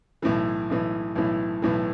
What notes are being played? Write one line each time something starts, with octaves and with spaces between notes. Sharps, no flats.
B1 A2 E3
B1 A2 E3
B1 A2 E3
B1 A2 E3